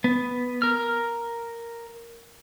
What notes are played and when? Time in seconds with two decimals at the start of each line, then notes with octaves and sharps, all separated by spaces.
0.04 B3
0.62 A#4 F6